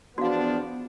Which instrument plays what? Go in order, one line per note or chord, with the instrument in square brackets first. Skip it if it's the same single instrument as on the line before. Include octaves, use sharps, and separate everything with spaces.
[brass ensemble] E2 F3 D4 [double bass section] B3 [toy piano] F#4 F5